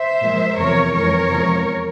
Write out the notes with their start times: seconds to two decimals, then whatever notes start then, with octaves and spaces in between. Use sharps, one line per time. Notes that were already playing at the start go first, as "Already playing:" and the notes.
Already playing: C5 E5
0.22 A#2 F3 G#3
0.58 E2 C3 F3 A#4 C#5
0.93 F2 E3 G#3 A#4 C#5
1.29 E2 C3 F3 G#3